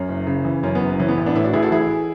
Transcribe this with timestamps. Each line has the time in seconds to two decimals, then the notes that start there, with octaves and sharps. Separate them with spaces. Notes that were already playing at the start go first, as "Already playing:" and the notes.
Already playing: F#2 C#4
0.09 F#1
0.27 C#3
0.45 E3
0.63 F#2 C#4
0.75 B3
0.81 F#1
0.99 E3 C#4
1.08 B3
1.17 A1
1.26 B3 D4
1.35 A2 C#4 E4
1.44 D4 F#4
1.53 A1 E4 G#4
1.63 F#4 A4
1.72 E3 E4 G#4